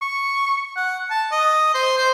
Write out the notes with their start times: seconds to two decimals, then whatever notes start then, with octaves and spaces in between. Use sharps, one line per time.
0.02 C#6
0.77 F#5
1.11 A5
1.31 D#5
1.74 C5
1.97 C5